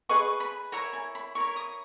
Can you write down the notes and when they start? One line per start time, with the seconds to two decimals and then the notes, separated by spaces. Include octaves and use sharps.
0.09 G#4 B4 D#5 C#6
0.40 B5
0.72 E4 A#4 C#5 A#5
0.93 G#5
1.15 B5
1.35 E4 A#4 C#5 C#6
1.56 D#6